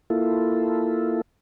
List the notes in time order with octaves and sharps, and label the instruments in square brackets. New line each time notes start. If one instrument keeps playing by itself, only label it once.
[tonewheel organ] A#3 E4 F4 A4